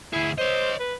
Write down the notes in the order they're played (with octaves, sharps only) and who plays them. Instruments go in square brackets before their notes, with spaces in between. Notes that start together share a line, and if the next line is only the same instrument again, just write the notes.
[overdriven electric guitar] D2 G#4 [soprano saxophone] E4
[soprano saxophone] C5 [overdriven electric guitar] C#5 D#5
[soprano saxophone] B4